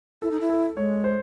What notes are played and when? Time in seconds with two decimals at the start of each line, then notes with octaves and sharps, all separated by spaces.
0.22 E4 A4
0.31 D#4
0.41 E4
0.50 A4
0.77 G#3 C#5
1.04 C5